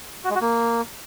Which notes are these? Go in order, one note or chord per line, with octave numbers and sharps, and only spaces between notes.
F#4
G#3
F#4
A#3